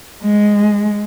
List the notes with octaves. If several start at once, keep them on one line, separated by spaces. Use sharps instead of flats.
G#3